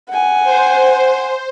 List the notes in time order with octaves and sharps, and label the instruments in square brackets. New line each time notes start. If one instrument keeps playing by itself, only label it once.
[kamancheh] F#5 G#5
[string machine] C5